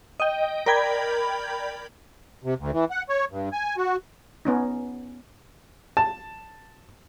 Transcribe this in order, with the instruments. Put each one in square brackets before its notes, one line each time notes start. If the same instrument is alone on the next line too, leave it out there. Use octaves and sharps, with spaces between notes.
[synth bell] D#5 G5
A#4 D5 G5 B5 G6 G#6
[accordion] C3
D2
E3
F#5
C#5
G2
G#5
F#4
[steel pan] B3 C#4 D#4
[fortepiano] A5